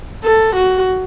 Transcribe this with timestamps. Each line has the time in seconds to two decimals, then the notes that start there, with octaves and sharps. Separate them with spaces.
0.24 A4
0.56 F#4